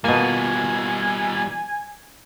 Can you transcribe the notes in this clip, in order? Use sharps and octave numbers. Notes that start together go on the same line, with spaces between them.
B2 G3 A#3 F4 G#5